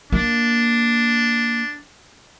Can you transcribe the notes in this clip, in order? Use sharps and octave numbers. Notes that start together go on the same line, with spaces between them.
A#3 D4